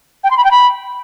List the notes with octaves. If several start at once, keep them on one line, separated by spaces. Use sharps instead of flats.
G5
C6
B5
G5
B5